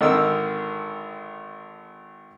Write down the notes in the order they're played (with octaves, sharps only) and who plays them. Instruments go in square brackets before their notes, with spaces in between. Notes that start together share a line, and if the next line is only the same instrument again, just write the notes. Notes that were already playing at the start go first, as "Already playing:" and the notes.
[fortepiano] G#1 D3 C4 D#4 A#4 E6